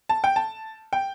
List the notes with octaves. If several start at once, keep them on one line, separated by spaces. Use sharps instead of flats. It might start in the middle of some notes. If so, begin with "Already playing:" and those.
A5
G5
A5
G5